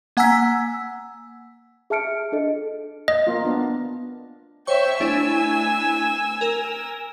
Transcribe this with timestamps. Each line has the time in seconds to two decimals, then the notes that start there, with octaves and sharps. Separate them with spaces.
0.17 A#3 F#5 G#5 A#5 E6 B6
1.90 G#4 E5 A5 F6 C#7 D7
2.32 D4 A4 D#5
3.08 D#5
3.27 A#3 F4
3.45 B3 D4
4.67 C5 C#5 E5 G5 C#6
5.00 A3 D4 E4 G#5 E6
6.41 A#4